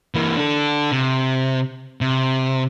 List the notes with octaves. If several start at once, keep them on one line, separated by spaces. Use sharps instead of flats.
E3 A#3
D4 A4
C3
C3